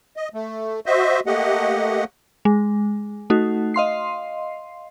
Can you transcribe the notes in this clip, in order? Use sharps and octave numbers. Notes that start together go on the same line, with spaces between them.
D#5
A3
F#4 C5 D#5 E5
A3 A#3 G4 D#5 F#5
G#3
A3 D#4 F#4
D#5 F5 C6 C7